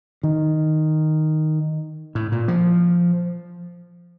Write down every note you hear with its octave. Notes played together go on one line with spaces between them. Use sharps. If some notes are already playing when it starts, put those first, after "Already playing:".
D#3
A2
A#2
F3